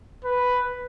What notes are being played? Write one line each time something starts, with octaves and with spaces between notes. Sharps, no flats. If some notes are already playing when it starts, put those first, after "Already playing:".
B4